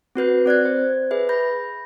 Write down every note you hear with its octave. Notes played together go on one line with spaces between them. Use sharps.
C4 F#4 B4 G6
C4 D5 F#6 G#6
C5
G#4 B4 E5
B5 G6 A#6